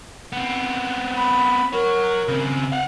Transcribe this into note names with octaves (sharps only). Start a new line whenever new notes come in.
B3 C4
B5
F#4 A#4 C#5
C#3 C4
F5 F#5